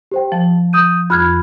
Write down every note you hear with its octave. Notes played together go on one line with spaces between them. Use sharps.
G4 C5 G5
F3 A5
D#6 G6 D#7
F2 B5 F6 F#6 G#6